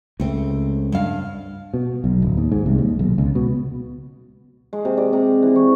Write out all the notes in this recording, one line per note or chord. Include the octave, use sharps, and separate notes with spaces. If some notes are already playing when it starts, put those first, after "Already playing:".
C#2 A3 C4
G2 F5
B2
B1
D1
D#2
G#2
C2
D#2
B1
C#2
B2
G#3
C3
D5
C3
E3
C#6